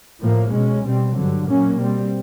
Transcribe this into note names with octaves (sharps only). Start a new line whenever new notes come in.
A2 F3 A#3
B2 G#3 C#4
B2 G3 C4
G2 D3 F#3
A#2 F#3 A#3 C#4
B2 G3 C4